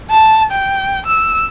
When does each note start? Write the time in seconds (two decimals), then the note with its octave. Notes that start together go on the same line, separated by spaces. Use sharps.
0.11 A5
0.52 G5
1.06 E6